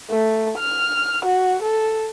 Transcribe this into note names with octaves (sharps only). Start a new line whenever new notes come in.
A3
F6
F#4
A4